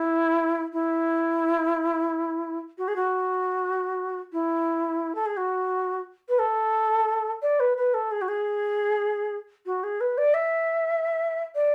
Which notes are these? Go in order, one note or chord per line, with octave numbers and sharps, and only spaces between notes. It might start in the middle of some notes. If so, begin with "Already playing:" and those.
Already playing: E4
E4
F#4
G#4
F#4
E4
A4
G#4
F#4
B4
A4
D5
B4
B4
A4
G#4
F#4
G#4
F#4
G#4
B4
D5
E5
D5